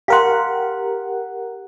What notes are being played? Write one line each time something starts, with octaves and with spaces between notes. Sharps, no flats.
G4 A#4 F5 F#5 C6